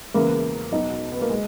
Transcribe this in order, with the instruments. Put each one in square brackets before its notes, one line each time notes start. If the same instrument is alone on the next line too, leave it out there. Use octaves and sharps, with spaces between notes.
[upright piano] E1 E2 C#3 E3 A#3
B1 B2 D#4
B3
A#3
G#3